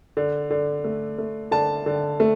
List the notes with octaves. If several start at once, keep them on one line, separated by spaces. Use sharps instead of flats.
D3
D3
A3
A3
D3 A5
D3
A3